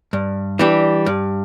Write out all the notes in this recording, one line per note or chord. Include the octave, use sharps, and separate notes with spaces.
G2
E3 G3 D4 G4
G2